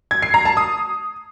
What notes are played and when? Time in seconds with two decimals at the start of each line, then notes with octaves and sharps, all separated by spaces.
0.11 G#6
0.22 C7
0.34 A#5
0.45 A5
0.57 D#6